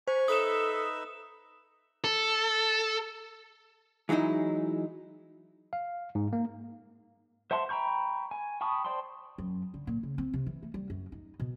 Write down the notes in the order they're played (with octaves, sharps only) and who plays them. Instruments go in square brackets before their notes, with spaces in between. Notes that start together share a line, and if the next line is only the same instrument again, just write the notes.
[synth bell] C5 [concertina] G#5 C#6
[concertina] D#4 B4 E5 [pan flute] A4 [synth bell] D#6 E7
[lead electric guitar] A4
[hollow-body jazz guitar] E3 F#3 G#3 D#4 E4
[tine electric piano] F5
G#2
A#3
[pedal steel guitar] C5 E5 F#5 A5 C6
G5 A#5 B5 C#6 G6
G#5
G5 A5 B5 C#6 D#6
C5 D5 G5 A5 C6
[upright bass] F#2
D3
A#2
C#3
C4
C3
E3
A3
G3
F#2
D#4
B2